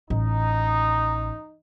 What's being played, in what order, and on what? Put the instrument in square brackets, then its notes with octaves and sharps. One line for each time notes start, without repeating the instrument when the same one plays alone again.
[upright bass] A1 [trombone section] D#4